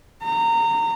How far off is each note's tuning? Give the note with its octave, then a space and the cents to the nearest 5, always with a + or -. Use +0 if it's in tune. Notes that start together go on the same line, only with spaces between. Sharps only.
A#5 -20